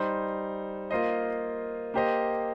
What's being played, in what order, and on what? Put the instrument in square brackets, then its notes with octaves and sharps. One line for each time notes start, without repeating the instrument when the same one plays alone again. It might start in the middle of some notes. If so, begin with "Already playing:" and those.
Already playing: [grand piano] G3 D#4 C5
A#3 F4 C5 D#5
A#3 G4 C5 D#5